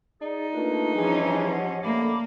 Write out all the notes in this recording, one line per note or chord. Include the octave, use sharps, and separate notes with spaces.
D#4 G#4 D5
A3 A#3 D4 F4 B4
E3 F3 G3 C#4 G#4
G4 D#5 F#5
D3 A3 A#3 B5 D6